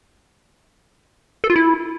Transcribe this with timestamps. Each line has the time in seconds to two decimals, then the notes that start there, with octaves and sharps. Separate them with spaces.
1.44 A4
1.50 F4
1.56 E4